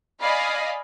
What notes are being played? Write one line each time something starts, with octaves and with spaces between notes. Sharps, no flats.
D5 D#5 F5 G#5 B5